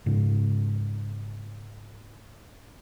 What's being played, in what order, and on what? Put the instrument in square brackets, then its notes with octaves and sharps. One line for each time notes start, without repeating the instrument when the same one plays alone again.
[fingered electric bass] G#2 C#3